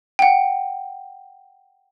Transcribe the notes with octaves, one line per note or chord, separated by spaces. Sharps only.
F#5 G5